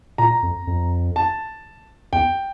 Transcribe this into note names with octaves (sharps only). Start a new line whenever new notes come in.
A#2 A#5
F2
F2
A5
E2 G5